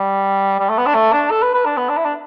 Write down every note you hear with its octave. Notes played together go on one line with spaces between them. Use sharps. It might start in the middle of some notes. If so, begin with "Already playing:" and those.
Already playing: G3
G3
A3
B3
D4
A3
D4
A4
B4
B4
D4
B3
D4
E4
D4